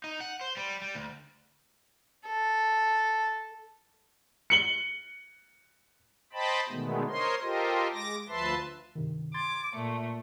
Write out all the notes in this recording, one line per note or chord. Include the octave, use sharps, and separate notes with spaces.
D#4
F#5
C5
G3
G3
D2
A4
C#7 F#7 G7
C5 D#5 G5 A5 B5
B2 D3 D#3 G#3 A3 B3
A#4 C5 C#5 D#5 C6
F4 G4 A4 A#4 C5 D#5
G#3 D6 A#6
D2 F3 B4 E5 A5 C6
G2 C3 D#3
C6 D6 G#6 A6
A#2 A3 C#7